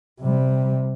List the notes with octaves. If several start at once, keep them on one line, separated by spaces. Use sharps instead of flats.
C3 G3